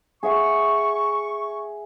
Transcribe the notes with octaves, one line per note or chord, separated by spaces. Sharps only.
G#4 E5 F#5 C#6